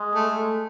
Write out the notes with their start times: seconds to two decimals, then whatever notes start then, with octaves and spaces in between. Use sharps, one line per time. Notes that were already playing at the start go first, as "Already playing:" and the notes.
Already playing: G#3
0.15 A3